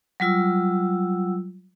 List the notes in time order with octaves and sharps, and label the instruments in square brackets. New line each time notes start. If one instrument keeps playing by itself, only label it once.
[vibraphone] F#3 G3 F4 E6